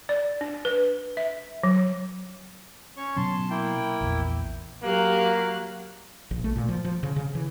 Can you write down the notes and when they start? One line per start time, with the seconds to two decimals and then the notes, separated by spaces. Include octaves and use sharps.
0.09 D5
0.41 D4
0.65 B4
1.17 E5
1.63 F#3
2.97 C#4 C#5 C#6
3.16 B2 F#3 C#4 A5 C6
3.50 A#3 E4 G5
4.01 A#1 E2
4.84 F#3 A#3 G4 F5 F#6
6.31 A#1
6.44 A3
6.56 A#2
6.68 F3
6.85 F3
7.03 C#3
7.16 C#3
7.35 E3